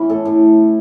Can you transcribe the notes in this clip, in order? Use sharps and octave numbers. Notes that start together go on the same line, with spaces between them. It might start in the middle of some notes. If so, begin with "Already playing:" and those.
Already playing: E3 B3 C#4 E4
A2 A4
A2